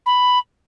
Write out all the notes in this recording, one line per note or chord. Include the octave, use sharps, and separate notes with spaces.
B5